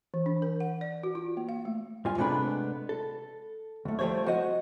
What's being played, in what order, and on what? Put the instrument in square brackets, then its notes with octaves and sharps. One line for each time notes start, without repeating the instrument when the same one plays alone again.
[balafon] E3
D4
A#4
F#5
D5
F#4
F4
A#3
F5
A3
[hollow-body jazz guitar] G2 F4 G#5
C3 G#3 A3 B3 D4 B5
A4
D2 A3
F3 G3 A3 C5 C#5
F#4 C5 D#5 F#5